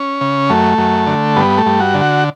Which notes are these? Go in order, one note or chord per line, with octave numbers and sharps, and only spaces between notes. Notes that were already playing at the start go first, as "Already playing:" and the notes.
Already playing: C#4
C#3
F#2 A3
F#2
D3
G2 B3
A3
G2
F#4
D3
F#4